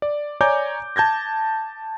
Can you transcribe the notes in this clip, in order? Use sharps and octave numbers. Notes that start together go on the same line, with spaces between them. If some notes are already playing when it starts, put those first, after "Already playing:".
D5
C#5 D5 G#5 A#5 D6 G6
A5 G6 G#6 A#6